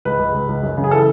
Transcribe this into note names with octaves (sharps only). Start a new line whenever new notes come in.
C#2 B4
C#2
C#2
C#2
F#2
C#3
G#4
E3 A4